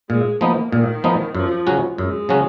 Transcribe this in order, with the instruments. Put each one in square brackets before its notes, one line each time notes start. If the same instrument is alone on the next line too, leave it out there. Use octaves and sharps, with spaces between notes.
[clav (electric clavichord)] A#2 [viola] G#3
[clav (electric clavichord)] F3 B3 D#4 [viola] A#3
[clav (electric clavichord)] A#2 [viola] D#3
[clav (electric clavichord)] F3 B3 D#4
[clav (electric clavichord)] F#2 [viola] F3
[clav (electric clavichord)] C#3 F#3 C#4 F#4
[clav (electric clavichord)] F#2 [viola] G#3
[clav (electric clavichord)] C#3 F#3 C#4 F#4